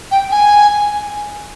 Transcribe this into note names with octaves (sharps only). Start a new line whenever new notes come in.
G5
G#5